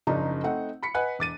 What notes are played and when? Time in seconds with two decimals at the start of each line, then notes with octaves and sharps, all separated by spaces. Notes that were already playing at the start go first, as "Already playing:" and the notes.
0.07 F#1 C#3 F3 D4 D#4 A#5
0.43 A3 C4 D#4 F#5
0.83 B5 B6 C#7
0.94 B4 D#5 F#5 G#5 F#6
1.19 E1 D6 A6 D#7